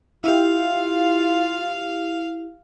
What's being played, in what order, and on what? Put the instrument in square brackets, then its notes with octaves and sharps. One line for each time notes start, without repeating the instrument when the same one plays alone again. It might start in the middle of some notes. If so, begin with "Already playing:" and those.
[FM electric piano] E4 G4 [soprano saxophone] F4 [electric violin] F5